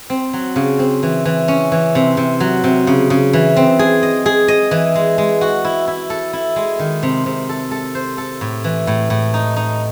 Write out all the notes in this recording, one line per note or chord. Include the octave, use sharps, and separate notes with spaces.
C4
F#3
C#3
C4
E3
E3
C#4
E3
C3
C3
F#3
C3
C#3
C#3
E3
C4
G#4
D#5
G#4
D#5
E3
G#3
G#3
F#4
E4
E4
A4
E4
G#3
D#3
C3
C3
A4
A4
C5
A4
A2
E3
A2
A2
D#4
D#4